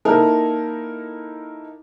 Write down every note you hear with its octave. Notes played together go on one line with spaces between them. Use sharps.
A#3 D#4 E4 A4 A#4